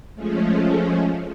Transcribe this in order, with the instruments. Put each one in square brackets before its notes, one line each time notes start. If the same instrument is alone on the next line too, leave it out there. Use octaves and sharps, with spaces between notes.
[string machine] F3 G#3 A3 C#4